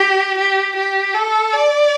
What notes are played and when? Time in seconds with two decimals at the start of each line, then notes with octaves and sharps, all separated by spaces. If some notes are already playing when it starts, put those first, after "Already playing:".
Already playing: G4
0.38 G4
0.76 G4
1.15 A4
1.53 D5